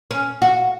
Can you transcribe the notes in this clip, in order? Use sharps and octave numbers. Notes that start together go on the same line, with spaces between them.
C#4
F#4